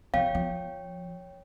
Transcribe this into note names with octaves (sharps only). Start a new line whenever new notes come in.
F2 C#3 C#5 F5 G5
F3